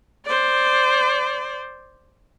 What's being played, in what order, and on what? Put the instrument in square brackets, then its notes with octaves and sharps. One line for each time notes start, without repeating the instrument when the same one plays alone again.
[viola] C5 D5